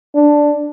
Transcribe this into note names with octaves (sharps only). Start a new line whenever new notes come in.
D4